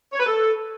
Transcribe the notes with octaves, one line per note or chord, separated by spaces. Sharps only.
C#5
B4
A4